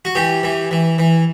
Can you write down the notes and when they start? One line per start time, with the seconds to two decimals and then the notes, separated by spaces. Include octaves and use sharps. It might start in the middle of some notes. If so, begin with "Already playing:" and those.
0.05 F#4
0.15 E3 G4
0.43 E3
0.71 E3
0.98 E3